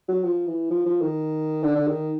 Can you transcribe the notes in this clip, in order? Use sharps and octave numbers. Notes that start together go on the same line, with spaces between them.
F#3
F3
E3
F3
F3
D#3
D3
D3
D#3